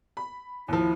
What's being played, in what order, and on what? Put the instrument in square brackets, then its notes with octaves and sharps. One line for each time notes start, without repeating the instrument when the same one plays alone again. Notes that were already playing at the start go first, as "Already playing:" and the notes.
[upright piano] B5
[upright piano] D#2 F3 [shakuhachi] E4